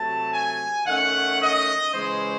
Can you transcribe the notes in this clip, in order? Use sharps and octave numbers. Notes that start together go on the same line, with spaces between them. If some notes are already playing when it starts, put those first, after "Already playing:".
Already playing: C3 F#3 A3 A5
G#5
D#3 A3 C#4 F#5
D#5
C#3 E3 G#3 C#4 C5